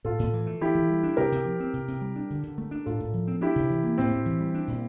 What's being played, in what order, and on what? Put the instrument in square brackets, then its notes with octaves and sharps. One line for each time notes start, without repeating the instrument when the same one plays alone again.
[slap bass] A2 [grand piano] F4 A4
[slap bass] A2
E3
A3
[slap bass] E3 [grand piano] E4 G4
[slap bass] E3
G3
D4
[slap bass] C3 [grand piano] G4 A#4
[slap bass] C3
F3
C4
C3
C3
G3
D4
D3
D3
A3
D4
[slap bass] A2 [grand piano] F4 A4
[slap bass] A2
F3
C4
[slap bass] D4 [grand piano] E4 G4
[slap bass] C3
E3
A#3
[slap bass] A2 [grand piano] C4
[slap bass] A2
E3
G3
D4
A#2